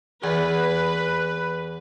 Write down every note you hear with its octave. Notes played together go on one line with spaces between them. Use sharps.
E2 B4